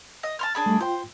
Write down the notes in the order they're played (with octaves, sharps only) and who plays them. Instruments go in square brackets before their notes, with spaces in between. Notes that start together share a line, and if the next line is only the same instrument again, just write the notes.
[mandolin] D#5
A5 C6 F6
D4 G#4 B5
[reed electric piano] G3 A3
[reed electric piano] F4 G5 [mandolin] C5